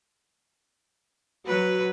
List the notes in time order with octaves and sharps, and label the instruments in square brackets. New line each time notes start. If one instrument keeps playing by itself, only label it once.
[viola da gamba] F#3 B4 [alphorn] F#4